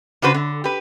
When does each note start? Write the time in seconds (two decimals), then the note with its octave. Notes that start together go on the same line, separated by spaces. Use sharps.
0.22 C#3 D4 F#4 B4 C5
0.34 D3
0.64 G4 B4